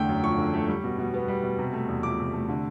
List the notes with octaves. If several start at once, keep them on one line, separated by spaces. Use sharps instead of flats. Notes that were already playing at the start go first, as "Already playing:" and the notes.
Already playing: E2 D3 A3 G5
F#2
F3 C#6
D3
A3
G3
B2
B2
B3
G3
B2
C3
A3
E2
F3 D6
C3
A3
D3